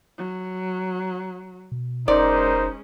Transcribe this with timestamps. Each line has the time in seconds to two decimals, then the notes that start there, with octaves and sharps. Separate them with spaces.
0.18 F#3
1.72 B2
2.08 F1 G#2 G#3 C#4 D#4 A#4 C5 D5